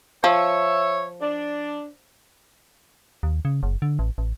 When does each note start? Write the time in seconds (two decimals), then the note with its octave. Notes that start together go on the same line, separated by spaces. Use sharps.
0.24 F3 C#5 E5
1.21 D4
3.23 D#2
3.45 C#3
3.63 F#1
3.82 D3
3.99 A1
4.18 A1